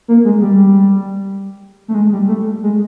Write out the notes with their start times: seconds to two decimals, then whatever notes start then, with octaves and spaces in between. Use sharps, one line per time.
0.08 A#3
0.25 G#3
0.42 G3
1.88 A3
1.95 G#3
2.12 G3
2.28 A3
2.63 G#3